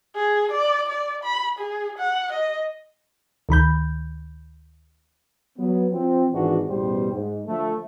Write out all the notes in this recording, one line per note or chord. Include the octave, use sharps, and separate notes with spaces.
G#4
D5
D5
B5
G#4
F#5
D#5
D2 D#3 B5 G6
F#3 B3
F3 C4
G#1 G#2 E3 D4 F#4
A1 E2 B2 G3 C5
G#2
D3 F3 A3